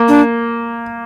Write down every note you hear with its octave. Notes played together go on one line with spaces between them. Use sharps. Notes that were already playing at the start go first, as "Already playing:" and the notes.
Already playing: A#3
D4